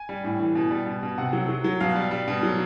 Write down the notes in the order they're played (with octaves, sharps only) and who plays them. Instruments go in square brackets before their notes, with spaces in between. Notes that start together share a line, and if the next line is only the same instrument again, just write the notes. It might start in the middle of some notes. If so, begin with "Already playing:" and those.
Already playing: [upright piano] G#5
G3
A2
E3
B2
G3
B2
B2
C3 F#5
F#3
F#3
F#3
B2 F5
G3
G3
B2
F#3